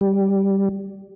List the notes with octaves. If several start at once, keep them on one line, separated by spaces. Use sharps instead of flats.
G3